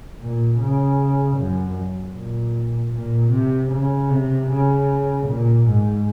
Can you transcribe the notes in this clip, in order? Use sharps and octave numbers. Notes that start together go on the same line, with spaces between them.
A#2
C#3
F#2
A#2
A#2
C3
C#3
C3
C#3
A#2
G#2